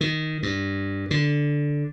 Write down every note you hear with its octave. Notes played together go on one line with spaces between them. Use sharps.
D#3
G2
D3